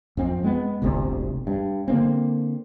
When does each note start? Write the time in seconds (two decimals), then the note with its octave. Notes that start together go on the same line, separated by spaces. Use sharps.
0.17 F2 C4
0.44 G#3 B3
0.82 D1 G1 D2 C3
1.47 G2
1.88 D3 A#3 C4